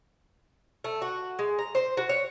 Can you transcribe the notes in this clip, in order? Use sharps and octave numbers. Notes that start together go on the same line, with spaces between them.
A3
F#4
G#3
A#5
C5
F#4
C#5